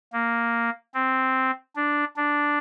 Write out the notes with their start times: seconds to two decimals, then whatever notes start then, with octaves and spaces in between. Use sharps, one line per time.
0.13 A#3
0.94 C4
1.76 D4
2.17 D4